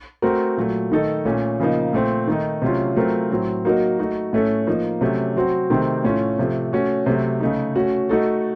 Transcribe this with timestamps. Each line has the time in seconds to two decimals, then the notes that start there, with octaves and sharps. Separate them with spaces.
0.22 A3 C4 F#4 A#4
0.57 A#2 F#3 A3
0.92 D#3 A3 D#4 A4
1.25 A#2 A3 C#4
1.60 C#3 F3 A#3 D#4
1.93 A#2 A3 C4
2.27 D#3 A3 D#4
2.62 C3 F#3 A3 C#4 F4
2.96 F#3 A3 C4 F4 A#4
3.31 A2 F#3 C4
3.65 F#3 A#3 D#4 F#4 A#4
3.99 A3 D#4 F#4
4.33 A2 A3 C#4 A4
4.67 F3 A#3 D#4
5.01 C3 F#3 A3 C#4
5.36 F#3 C4 F#4
5.70 C3 D#3 A3 C4
6.04 A2 A3 C#4 F4
6.39 C3 F3 A3
6.73 A3 C#4 F#4
7.06 C3 F#3 A3
7.40 C#3 A3 D#4
7.76 A3 C#4 F#4
8.09 A3 D#4 F#4 A4